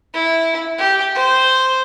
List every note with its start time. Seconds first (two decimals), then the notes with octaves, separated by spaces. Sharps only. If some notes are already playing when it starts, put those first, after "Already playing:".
0.14 E4
0.78 G4
1.15 C5